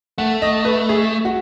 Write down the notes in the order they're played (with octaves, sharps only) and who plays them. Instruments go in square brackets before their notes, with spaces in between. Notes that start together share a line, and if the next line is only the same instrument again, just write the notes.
[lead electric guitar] A3 [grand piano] F#5
[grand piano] D#5
B4
G#4
F#4